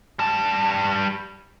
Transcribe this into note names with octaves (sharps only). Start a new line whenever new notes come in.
G3 A5